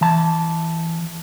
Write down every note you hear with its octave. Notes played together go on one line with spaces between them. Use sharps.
E3 A5